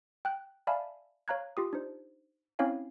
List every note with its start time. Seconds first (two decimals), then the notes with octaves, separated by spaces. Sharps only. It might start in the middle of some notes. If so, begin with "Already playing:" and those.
0.25 G5 F#6
0.67 D5 E5 F5 G#5 A5 B5
1.28 C#5 F5 A#5 F#6 G#6
1.57 F4 G4 D#6
1.73 D4 D#4 C5
2.59 C4 C#4 E4 C#5 F5 G#5